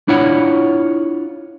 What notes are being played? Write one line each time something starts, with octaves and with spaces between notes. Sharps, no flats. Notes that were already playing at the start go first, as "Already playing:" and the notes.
D4 E4 F4 C#5 F#5 B5